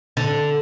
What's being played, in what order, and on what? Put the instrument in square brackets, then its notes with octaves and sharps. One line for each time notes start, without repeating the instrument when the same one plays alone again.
[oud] D3